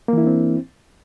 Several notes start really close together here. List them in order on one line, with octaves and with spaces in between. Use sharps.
A#3 E3 E4 D4 C4